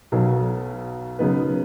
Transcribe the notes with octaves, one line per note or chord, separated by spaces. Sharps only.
B1 B2 F#3
C#3 F#3 B3 D#4 B4